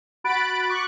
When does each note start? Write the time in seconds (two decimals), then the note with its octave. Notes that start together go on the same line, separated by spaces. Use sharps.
0.24 F#4 B5 F#6 A6 D7
0.69 C#6 D6 F#6